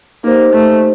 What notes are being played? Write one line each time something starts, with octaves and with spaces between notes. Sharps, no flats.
A#3 D#4 G4 C5
A3